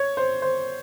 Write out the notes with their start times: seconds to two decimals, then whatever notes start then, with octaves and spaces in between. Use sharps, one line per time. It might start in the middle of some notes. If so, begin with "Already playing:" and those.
Already playing: C#5
0.17 C5
0.42 C5